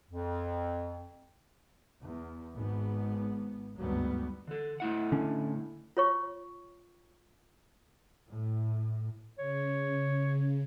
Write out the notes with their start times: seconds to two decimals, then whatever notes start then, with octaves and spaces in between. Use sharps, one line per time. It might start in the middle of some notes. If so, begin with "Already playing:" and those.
0.11 F2
2.01 E2
2.54 G#1 G#2 B3
3.76 G#1 D2 G2 F#3 G3 B3
4.47 D3 A4
4.80 A2 E4 F#5
5.12 D3 C#4 D4
5.97 F4 C#5 C#6
8.29 A2
9.39 C#3 C#5